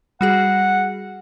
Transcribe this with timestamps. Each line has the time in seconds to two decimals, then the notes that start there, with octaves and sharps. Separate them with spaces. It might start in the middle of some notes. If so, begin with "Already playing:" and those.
0.21 G3 F#4 G#4 F#5